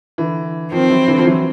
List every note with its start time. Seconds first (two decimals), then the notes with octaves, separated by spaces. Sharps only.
0.18 D3 E3
0.72 D#3 F3 C4
0.90 E3 F#3
1.08 D3 E3
1.18 F3
1.25 E3 F#3